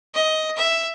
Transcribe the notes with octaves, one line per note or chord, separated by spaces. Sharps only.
D#5
E5